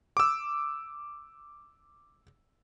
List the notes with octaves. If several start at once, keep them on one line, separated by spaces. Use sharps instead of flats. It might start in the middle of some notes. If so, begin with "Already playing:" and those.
D6 E6